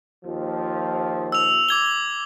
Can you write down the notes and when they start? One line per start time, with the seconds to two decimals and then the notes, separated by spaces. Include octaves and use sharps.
0.24 D#2 F3
1.32 E6 F7
1.69 D6 G#6 G7